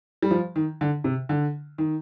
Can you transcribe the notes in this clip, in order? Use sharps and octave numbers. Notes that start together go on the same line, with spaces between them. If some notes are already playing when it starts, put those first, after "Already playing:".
G3
F3
D#3
D3
C3
D3
D#3